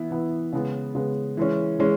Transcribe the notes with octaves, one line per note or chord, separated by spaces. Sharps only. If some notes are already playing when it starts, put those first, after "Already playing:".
Already playing: E3 B3 E4
E3 B3 E4
C#3 G#3 B3
C#3 G#3 B3
E3 G#3 C#4
E3 G#3 C#4